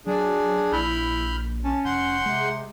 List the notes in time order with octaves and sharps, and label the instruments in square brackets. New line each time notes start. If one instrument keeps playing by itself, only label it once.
[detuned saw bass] F#3 [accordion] D4 G#4
[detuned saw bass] A#1 [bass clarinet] E4 [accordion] B5 F6 G6
[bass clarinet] C#4 [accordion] A5
[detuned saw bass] F1 [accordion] F#5 C6 G6
[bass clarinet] C3 [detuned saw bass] G#3